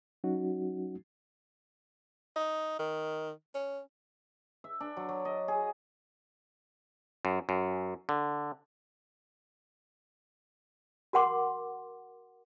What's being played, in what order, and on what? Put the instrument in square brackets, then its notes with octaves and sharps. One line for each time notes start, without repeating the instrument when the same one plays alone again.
[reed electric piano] F#3 C#4 D#4 F#4
[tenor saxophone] D#4
D#3
C#4
[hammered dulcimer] E5
D4
F#3
F#3
D#5
G#4
[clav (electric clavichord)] F#2
F#2
D3
[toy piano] F#4 A#4 F#5 C6 D6